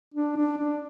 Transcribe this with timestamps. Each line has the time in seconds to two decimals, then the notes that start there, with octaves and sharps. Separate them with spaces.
0.14 D4
0.37 D4
0.58 D4